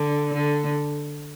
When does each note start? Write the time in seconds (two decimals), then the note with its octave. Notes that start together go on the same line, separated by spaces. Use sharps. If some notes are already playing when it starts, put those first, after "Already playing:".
Already playing: D3
0.34 D3